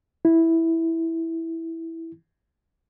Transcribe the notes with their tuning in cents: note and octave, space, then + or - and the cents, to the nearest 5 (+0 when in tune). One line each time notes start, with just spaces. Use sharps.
E4 -5